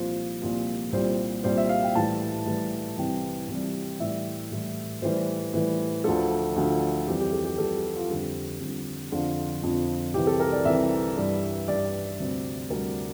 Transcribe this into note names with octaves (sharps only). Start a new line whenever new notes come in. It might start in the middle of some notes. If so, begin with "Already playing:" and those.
Already playing: C2 A#2 F3 C5
C2 A#2 F3
C2 A#2 G3 C5
C2 A#2 G3 C5
E5
F5
G5
A2 E3 G3 A5
A2 E3 G3
C2 C3 E3 G3 G5
C2 C3 E3 G3
A2 E3 G3 E5
A2 E3 G3
A2 E3 G3 C5
A2 E3 G3
D2 D3 F3 A4
D2 D3 F3
F2 E3 G3 G4
G4
A4
G4
F2 E3 G3 A4
F4
F2 D3 G3 G4
F2 D3 G3
F2 D3 F3 F4
F2 D3 F3
C2 C3 E3 G4
A4
A#4
D5
C2 C3 E3 E5
G2 E3 G3
G2 E3 G3 D5
D2 C3 G3
D2 C3 G3 A#4